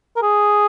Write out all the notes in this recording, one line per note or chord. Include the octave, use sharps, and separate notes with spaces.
A#4
G#4